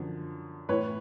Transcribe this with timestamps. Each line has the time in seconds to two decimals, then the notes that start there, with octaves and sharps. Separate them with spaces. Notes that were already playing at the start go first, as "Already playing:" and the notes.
Already playing: F#2 D3 F3
0.69 A2 E3 B4 C#5